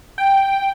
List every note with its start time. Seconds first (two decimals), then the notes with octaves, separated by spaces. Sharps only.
0.18 G5